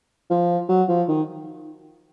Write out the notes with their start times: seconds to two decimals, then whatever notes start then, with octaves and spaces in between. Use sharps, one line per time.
0.30 F3
0.69 F#3
0.89 F3
1.08 D#3